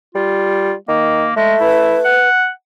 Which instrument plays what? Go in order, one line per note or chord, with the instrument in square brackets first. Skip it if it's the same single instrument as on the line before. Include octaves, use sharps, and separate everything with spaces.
[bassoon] G3 [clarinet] F4
[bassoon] D#3 [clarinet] A#3
[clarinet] G#3 [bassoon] A3
[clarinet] E4 [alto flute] B4
[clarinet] F#5